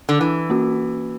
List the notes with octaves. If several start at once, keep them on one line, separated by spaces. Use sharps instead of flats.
D3
E3
A#3 C#4 F#4